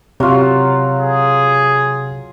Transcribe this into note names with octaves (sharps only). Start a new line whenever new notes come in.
C3 F#3 F4
G#4